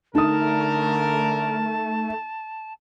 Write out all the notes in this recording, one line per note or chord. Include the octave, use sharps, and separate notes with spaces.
D3 A3 D#4 A#4 A5 D#6